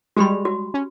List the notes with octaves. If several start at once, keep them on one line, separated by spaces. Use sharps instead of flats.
G3 G#3 F#4 G4 B5
F#4
C#4